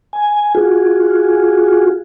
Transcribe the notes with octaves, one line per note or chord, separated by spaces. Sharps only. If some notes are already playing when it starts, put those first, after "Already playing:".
G#5
F4 F#4 G#4